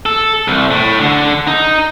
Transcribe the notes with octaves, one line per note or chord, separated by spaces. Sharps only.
A4
C2
A2
D3
D#4